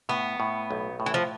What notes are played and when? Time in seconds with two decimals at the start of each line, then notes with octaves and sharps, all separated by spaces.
0.09 A2 B3
0.40 A2
0.71 B1
1.00 A2
1.06 E3
1.14 F3